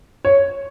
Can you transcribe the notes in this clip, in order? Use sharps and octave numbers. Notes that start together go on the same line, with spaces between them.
C#5